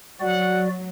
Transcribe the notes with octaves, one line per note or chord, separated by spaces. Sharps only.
F#3 F#4 D5 F#5